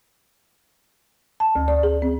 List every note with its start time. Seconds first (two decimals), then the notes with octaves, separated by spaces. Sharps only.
1.40 A5
1.55 D2
1.68 D5
1.83 G#4
2.02 C4